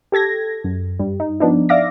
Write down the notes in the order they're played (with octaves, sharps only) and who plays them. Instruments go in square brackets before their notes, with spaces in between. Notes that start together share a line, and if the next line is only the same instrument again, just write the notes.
[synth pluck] G4 A4 G#6 A#6
F#2
G2 G3
D#4
F3 B3 D4 D#4
D5 E5 F5 D6 A#6